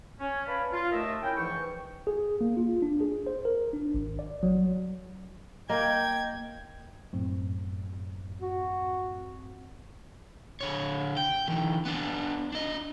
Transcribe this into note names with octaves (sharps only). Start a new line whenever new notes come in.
C#4
B4 C#5 D5 F5 A5 B5
F4
D#2 A3 A#4 D#5 E5 A5
C#4 E4 A#4 G5
G#2 E3 F3 G5 C#6
G#4
A#3
F4
D4
G#4
C5
A#4
D4
G#1
D5
F#3
A#3 D#5 G5 G#6
F#2 A2 C4
F#4
D3 C#5
G5
D3 E3
B3 D4
D4 D#5